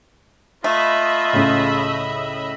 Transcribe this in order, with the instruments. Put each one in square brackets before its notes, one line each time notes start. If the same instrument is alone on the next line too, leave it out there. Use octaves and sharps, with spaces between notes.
[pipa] A3 [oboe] F4 [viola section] D#5 E5 B5
[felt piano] C#2 A2 C#3